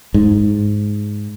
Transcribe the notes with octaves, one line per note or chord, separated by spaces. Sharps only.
G#2